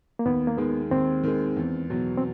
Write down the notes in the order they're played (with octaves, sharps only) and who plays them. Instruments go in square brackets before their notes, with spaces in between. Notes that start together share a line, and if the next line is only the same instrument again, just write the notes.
[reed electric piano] A#3
[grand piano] D#2 [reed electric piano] B3
[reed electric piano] A#3
[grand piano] D#3 G#3 [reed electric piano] B3
[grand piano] D#2 [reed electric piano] C4
[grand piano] D#3 G#3
E2
B2 F#3
[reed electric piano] C4